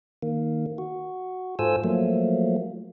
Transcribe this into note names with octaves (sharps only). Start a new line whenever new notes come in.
D#3 A#3
F#4
G#2 F4 A4 C5 G#5 E6
F3 F#3 A3 A#3